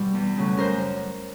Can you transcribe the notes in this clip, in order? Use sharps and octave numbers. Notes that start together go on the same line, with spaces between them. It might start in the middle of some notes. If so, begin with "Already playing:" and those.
Already playing: B2 G3
E2
C#3 F#3 A3
F#2 A#4 C5